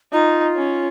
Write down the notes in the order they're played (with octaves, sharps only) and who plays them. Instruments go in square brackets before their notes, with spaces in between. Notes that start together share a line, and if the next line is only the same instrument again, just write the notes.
[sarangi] D#4 [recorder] F4
[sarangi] C#4